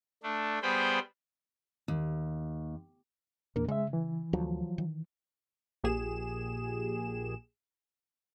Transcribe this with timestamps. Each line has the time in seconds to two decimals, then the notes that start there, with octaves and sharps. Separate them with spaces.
0.23 A3 D4
0.62 G3 B3 G#4 C5 G5 B5
1.88 D#2
3.56 E2 A#2 A#3 D4 A#4
3.68 C#3 G#3 E5
3.93 E3
4.33 D2 F3 F#3
4.78 D#3
5.83 A#1 A#2 G4 G#4 E7